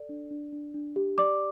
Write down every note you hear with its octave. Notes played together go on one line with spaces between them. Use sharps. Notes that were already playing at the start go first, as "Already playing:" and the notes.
Already playing: A4 D5
D4
D4
D4
D4
G4
D5 D6